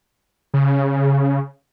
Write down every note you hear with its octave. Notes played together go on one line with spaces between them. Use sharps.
C#3